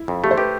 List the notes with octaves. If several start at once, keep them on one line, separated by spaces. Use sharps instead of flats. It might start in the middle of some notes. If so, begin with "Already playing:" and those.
Already playing: E4
F2
A3 G4
C5
G4 B4